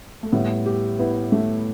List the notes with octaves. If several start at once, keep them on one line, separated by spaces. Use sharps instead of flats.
A3
A2 G3 B3
G4
B3 E4 B4
A3